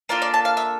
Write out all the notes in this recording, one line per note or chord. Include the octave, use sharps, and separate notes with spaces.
A#3 D4 F4 A4 D5
D5
A5
F5
E5